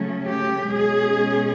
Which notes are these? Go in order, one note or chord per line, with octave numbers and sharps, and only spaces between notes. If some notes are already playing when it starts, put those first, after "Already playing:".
Already playing: C#3 F#3 A3 C#4
G4
B2 G#3 C#4 G#4